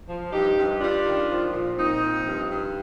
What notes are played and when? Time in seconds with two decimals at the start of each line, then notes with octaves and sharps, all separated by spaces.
0.09 F3
0.33 G2 D#4 G4
0.56 G2
0.80 G3 D4 F4
1.05 D#3
1.29 F3
1.52 A#2
1.77 A#2 C4 D#4
2.01 F3
2.26 G2
2.49 G2